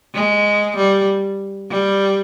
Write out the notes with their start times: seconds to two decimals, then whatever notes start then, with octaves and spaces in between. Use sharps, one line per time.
0.14 G#3
0.76 G3
1.70 G3